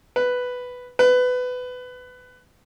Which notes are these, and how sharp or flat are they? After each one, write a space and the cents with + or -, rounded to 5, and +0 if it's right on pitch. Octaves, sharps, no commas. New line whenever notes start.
B4 +5
B4 +20